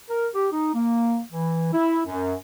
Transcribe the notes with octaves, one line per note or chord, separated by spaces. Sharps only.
A#4
G4
D#4
A#3
E3
E4
F#2